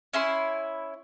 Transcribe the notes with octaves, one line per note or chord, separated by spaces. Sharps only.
C#4 E4 E5 C6